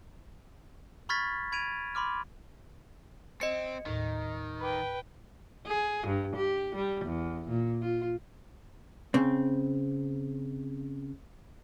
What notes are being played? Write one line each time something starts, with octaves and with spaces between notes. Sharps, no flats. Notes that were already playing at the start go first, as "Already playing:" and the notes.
B5 C#6 F6 G#6 A6 B6
B5 G#6 D7 D#7 F7
B5 C6 D6 F6
C4 D#5 C#7
D#2 A2 D#3
B4 G5 B5 D6
G#4
G2
G4
G3
E2
A#2
F4
C#3 C4